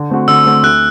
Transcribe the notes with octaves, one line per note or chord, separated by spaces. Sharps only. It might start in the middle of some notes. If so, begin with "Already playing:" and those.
Already playing: D3
A3 C4 F#4
D3 E6
A3 C4 F#4
D2 F#6